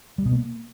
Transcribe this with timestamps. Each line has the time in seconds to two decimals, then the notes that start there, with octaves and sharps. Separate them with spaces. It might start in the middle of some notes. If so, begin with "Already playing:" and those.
0.18 G3
0.25 B2
0.33 A#3